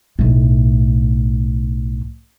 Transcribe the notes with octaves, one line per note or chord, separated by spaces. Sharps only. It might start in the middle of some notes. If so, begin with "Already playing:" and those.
B1 A2